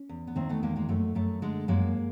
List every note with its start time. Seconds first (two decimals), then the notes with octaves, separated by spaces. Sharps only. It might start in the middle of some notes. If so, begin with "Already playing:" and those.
Already playing: C#4
0.09 E2
0.27 B3
0.36 D#3 A#3 C4
0.49 A3 B3
0.63 E2 G#3 A#3
0.76 G#3 A#3
0.89 F#2 A3
1.15 F#2 A3
1.42 D3 G#3
1.68 F#2 G#3 A#3